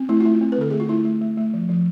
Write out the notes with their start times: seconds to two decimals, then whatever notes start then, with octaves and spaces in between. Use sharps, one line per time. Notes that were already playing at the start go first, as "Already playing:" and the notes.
Already playing: C4
0.09 A3 E4
0.21 F4
0.25 A3 E4
0.41 C4
0.52 B4
0.58 D3 A4
0.70 A3 G#4
0.80 F4
0.89 A3 E4
1.05 A3
1.21 A3
1.37 A3
1.54 F3
1.69 F3